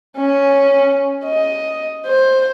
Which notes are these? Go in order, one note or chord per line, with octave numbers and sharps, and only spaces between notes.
C#4
D#5
C5